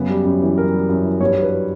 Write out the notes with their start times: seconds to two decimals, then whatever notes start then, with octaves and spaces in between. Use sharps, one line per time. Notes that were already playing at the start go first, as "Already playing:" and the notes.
Already playing: F#2 C#3 B3
0.09 G3
0.25 F#2
0.42 E3
0.58 F#2 A#4
0.73 G3
0.89 F#2
1.04 E3
1.21 G2 C#5
1.37 F#3
1.42 B4